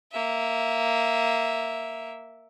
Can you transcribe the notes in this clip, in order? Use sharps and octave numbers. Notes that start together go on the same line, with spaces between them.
A#3 E5